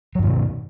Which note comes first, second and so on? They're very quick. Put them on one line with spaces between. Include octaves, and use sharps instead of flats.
F#3 G2 D#3 B2